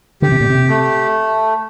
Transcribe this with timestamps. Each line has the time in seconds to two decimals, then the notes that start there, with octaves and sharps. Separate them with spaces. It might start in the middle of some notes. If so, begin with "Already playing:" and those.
0.22 D3 G4
0.32 C3
0.40 A#2
0.50 C3
0.69 A3